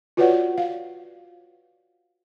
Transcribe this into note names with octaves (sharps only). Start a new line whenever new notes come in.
F4 F#4 B4 C#5 D5 F#5
F5